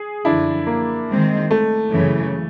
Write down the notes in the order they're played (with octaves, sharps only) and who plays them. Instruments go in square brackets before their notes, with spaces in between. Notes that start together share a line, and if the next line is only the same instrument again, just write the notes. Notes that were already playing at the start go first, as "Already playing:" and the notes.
Already playing: [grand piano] G#4
[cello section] F#2 D3 F3 [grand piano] D4 E4
[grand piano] A#3
[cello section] D#3 G#3 C4
[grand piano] A3
[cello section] F#2 C#3 E3